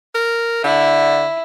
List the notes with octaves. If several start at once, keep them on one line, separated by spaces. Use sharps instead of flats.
A#4
D3 E4